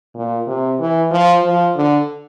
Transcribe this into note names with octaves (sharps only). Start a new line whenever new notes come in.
A#2
C3
E3
F3
F3
D3